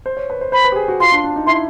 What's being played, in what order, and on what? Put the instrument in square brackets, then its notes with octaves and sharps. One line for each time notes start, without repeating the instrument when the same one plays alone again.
[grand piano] C5
C#5
B4
C5
[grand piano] C5 [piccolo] B5
[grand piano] B4
G4
G#4
F#4
[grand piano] F4 [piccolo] C6
[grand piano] D4
D4
D#4
[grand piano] E4 [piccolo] C6